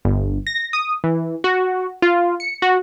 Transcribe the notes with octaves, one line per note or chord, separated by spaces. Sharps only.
G1
A#6
D#6
E3
F#4
F4
C#7
F#4